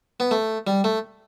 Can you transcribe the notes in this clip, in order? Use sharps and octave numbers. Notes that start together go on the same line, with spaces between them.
B3
A3
G3
A3